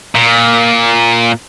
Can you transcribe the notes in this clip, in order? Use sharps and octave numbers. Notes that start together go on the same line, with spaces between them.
A#2